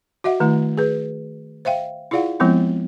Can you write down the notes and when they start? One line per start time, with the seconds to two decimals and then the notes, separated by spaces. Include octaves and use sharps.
0.24 F#4 D#5 E5 F#5
0.40 D#3 A3 E4
0.78 G#4 B4
1.65 C5 E5 F5 G5
2.11 E4 F4 G#4 D5 F5 F#5
2.40 F3 G#3 B3 C4 E4